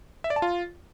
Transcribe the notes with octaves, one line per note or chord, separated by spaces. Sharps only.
E5
D5
A5
F4